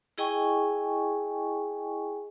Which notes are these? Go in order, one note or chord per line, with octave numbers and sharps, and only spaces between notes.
E4 G#4 D#5 G5 G#5 C#6